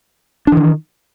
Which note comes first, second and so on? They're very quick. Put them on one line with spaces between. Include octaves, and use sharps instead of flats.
D4 E3 D#3